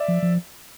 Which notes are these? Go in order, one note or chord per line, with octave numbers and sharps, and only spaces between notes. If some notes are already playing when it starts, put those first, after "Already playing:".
Already playing: D5 E5
F3
F3